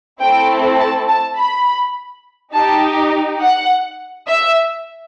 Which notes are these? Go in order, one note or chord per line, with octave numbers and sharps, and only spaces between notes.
A3 C4 E4 A4 G5
A5
A5
B5
D#4 G4 A5
F#5
E5